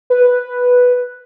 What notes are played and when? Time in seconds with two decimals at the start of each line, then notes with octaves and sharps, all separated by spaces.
0.10 B4